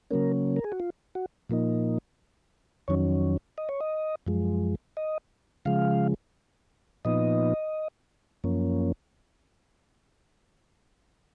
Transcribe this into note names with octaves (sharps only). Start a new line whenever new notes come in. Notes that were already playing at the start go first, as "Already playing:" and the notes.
C#3 F#3 A#3 C#4 A#4
A#4
G#4
F#4
F4
F#4
A#2 F3 A#3 D#4
F2 D#3 F#3 C#4 C#5
D#5
C#5
D#5
F#2 F3 G#3
D#5
C#3 F3 G#3 F5
A#2 F3 B3 D#4 D#5
F#2 F3 A#3 C#4